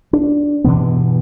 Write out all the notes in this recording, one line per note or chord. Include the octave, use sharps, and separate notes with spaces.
D4
G2 B2 E3 B3